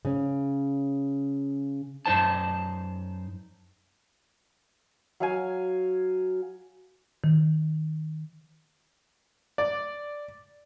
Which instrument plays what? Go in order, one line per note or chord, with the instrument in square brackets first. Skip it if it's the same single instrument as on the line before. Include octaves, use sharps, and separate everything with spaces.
[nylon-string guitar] C#3 C#4
[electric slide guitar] F#2 D#4 C5 A5
[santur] F#3 F5 G#5
[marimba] D#3
[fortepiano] D5